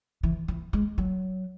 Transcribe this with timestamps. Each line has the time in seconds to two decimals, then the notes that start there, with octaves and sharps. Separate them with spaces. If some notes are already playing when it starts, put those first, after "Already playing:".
0.23 E3
0.48 E3
0.73 G#3
0.98 F#3